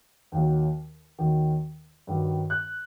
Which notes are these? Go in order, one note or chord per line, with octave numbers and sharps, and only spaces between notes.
D#2 D#3 F#3
D#2 D#3 F#3
G2 D#3 F#3
F#6